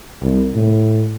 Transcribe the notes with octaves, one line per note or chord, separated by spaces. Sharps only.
C2
A2